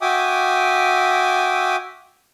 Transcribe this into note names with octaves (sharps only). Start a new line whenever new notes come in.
F#4 E5 G5 G#5 D6 D#6